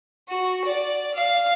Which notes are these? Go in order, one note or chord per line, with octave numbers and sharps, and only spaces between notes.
F#4
D5
F5